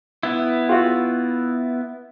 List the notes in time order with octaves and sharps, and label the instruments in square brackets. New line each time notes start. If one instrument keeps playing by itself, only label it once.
[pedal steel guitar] B3 E4
[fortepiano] F4 F#4